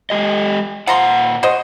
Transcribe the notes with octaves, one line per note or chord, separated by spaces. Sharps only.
G#3 G4 D#5
A#2 F3 F#5 A#5 C6
F#4 C5 D#5